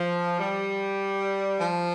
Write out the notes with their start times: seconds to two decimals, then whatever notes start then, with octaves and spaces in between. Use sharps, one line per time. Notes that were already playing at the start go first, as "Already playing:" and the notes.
Already playing: F3
0.40 G3
1.59 F3